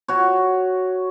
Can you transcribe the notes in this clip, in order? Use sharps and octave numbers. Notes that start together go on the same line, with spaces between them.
F#4 C#5